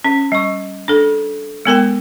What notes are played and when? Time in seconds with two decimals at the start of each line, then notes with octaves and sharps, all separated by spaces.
0.04 C#4
0.32 G3 C#6
0.88 D4 A4
1.65 G#3 B3 A#4 G5